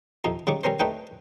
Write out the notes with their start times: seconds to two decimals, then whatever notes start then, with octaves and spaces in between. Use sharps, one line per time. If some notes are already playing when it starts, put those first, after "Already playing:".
0.24 F2 C3 F3 D#4
0.47 C#3 G3 D#4 C#6 D6
0.64 G3 C4 C#4 A#4 C5
0.80 A3 D4 D#4 G4 B4 G5